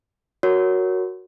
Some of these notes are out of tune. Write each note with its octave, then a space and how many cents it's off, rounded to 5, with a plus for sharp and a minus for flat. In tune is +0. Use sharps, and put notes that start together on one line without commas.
F#4 +0 A#4 +0 C#5 +0